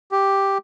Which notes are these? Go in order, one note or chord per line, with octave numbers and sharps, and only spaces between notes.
G4